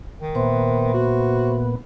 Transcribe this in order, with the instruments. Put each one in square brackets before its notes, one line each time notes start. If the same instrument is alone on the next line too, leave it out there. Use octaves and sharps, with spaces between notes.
[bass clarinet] D#3
[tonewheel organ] A#2 B3 [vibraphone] C5 E5 C6
[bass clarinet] F#4